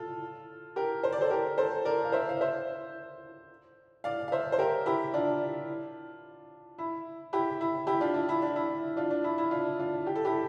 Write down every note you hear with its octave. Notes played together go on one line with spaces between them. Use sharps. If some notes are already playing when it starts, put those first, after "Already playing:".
Already playing: F4 A4
G4 A#4
C5
D5
A4 C5
G4 A#4
A4 C5
A#4 D5
F5
C5 E5
F5
C5 E5
D5 F5
F5
C5 E5
C5
G4 A#4
E4 G4
D4 F4
E4
E4 G4
E4
E4 G4
D4 F4
D4
E4
D4
E4
D4 F4
D4
E4
E4
D4 F4
D4 F4
G4
A4
E4 G4